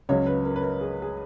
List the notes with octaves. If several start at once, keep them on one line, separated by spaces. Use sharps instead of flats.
C#2 C#3 F#3 C#4 C#5
B4
A#4
B4
A#4
G#4
G#4